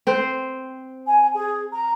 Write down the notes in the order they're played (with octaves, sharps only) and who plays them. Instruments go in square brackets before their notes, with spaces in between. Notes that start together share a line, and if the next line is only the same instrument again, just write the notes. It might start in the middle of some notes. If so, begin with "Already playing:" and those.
[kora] C4 C5
[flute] G#5
G#4
A#5